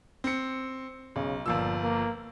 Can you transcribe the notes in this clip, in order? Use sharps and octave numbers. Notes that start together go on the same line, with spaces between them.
C4 C#7
B1 C#3
G1 A#2 F3 E6
A#3